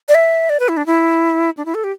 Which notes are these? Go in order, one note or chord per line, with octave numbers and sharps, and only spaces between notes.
D5
E5
D5
B4
E4
D4
E4
D4
E4
A4
G4